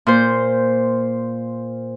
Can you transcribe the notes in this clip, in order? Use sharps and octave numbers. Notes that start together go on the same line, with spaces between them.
A#2 C5